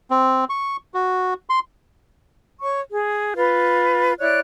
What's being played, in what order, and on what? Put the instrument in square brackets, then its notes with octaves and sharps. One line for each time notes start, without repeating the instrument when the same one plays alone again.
[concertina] C4
C#6
F#4
C6
[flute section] C#5 C#6
G#4
F4 B4
E4 C#5 D5 F#6